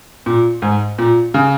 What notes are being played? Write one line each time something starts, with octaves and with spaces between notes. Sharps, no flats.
A#2
G#2
A#2
C#3